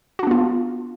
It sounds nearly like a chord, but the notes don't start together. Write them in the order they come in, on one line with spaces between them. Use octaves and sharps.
F#4 D4 B3 F4